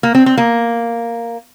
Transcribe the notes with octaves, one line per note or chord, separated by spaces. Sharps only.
A#3
C4
C4
A#3